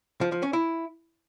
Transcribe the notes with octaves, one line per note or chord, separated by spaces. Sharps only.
F3
F3
C#4
E4